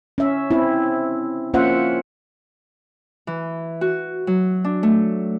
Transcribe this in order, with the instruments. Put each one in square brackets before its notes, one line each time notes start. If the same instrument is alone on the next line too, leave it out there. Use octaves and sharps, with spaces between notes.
[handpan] C#4 E5
C4 E4
A#3 C#4 F4 C5 E5 F#5
[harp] E3
F#4
F#3
D4
A3